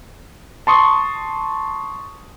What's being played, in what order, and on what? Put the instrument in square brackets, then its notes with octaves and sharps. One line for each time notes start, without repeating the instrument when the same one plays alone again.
[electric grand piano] A5 C6 C#6 D#6